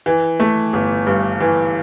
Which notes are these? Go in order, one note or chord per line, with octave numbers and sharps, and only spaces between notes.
E3
A3
G1
G2
E3